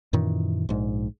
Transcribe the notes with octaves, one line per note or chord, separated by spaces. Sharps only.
F#2 A#2 D#3 E3
A#1 G#2